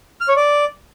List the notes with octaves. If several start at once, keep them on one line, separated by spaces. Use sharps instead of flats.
F6
C#5
D5